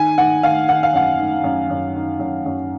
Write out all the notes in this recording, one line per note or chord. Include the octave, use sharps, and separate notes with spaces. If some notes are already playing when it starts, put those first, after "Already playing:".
Already playing: D#3 G#5
D#3 F#5
D#3 F5
D#3 F#5
F5
F#2 F#5
D#3
F#2
F#2
D#3
F#2
F#2